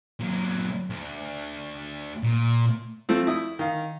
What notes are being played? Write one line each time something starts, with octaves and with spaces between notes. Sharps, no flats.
A#2 F#3
D2
A#2
F3 A3 C4
E4 D#6
D#3 F5